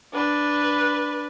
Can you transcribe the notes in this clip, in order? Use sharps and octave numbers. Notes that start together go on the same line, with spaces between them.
D4 B4